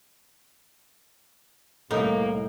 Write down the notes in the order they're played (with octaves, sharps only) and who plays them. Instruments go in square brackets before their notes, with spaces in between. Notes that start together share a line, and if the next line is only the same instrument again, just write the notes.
[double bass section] C2 [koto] A2 D#4 [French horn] A#3